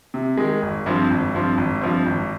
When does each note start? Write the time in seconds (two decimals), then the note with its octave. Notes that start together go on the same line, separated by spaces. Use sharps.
0.14 C3
0.37 D#3 G#3
0.62 G#1
0.86 G2 F3 C4
1.10 G#1
1.34 G2 F3 C4
1.58 G#1
1.81 G2 F3 C4
2.06 G#1